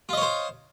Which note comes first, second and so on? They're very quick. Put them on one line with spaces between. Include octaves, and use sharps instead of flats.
F4 D#5 C#5 C5